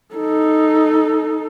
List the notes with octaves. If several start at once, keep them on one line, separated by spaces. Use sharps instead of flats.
D#4 A4